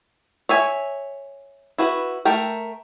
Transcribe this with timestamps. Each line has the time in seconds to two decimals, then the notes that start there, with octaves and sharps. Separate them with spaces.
0.49 C#5 E5 G#5
1.78 E4 F#4 B4
2.25 A3 A#4 G5